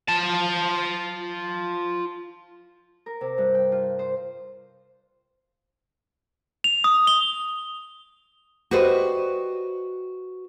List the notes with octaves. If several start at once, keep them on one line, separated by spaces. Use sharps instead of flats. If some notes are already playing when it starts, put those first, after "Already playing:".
F4 A5
A#4
C3
G2
G5
F4
C5
F7
D#6
G7
F#4 G4 B4 C5 D5 D#5